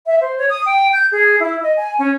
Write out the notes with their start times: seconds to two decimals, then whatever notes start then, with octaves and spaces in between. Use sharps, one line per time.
0.07 E5
0.21 C5
0.38 C#5
0.50 D#6
0.66 G5
0.93 G6
1.12 G#4
1.40 E4
1.63 D#5
1.77 G#5
1.99 C#4